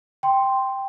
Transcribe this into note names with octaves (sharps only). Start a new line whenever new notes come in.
G5 C6